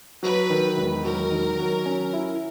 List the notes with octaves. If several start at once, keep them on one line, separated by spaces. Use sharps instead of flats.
F#3 B4
D#3
E1
F#3 A#4
D#3
F#3
C#4
E4